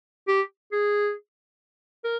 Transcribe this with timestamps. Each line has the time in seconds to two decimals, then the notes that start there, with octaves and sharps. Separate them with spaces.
0.28 G4
0.72 G#4
2.04 A#4